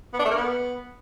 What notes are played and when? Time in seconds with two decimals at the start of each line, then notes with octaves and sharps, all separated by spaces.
0.14 B3
0.19 D4
0.25 A3
0.31 A#3
0.37 B3